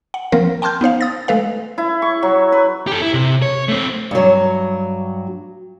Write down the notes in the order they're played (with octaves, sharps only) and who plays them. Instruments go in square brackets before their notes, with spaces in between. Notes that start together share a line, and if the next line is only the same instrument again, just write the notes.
[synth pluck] F#5
F3 A#3 C4 A#4
G5 A5 C6 F6 G6
B3 D#4 C5 F5
D#6 A6
G#3 A3 A4 B4 F5
[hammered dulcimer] E4
C#6
F#3
B4
[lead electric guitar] G4 A4
E4
C3
C#5
A3 C4
[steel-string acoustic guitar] G2 F#3